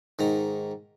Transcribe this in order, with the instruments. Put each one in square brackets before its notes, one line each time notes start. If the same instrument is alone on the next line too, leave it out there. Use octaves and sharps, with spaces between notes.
[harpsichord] G#2 D#3 A#5